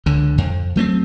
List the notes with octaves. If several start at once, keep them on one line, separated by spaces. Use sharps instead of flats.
C#2 D3
F2
F#3 A3 A#3 C4